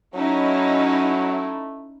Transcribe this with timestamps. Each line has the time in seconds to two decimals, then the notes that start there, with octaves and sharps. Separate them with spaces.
0.15 F#3 A3 C#4 D#4 E4